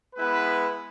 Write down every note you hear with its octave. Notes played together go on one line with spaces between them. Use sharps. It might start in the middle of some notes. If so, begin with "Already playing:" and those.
G#3 B3 E4 B4